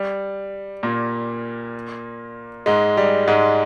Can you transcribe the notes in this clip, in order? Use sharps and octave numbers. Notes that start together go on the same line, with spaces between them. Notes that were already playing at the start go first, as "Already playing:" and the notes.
Already playing: G3
A#2 A#3
G#2 G#3
G3
G#2 G#3